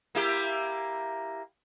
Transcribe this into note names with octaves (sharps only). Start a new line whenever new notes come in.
A#3 E4 G4